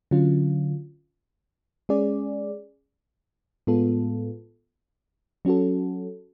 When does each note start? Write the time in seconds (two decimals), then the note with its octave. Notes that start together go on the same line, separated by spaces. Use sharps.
0.11 D3 F#3 C#4 F4
1.89 G#3 C#4 G#4 D5
3.67 A2 G#3 B3 F4 A4
5.45 F#3 C#4 F#4 A4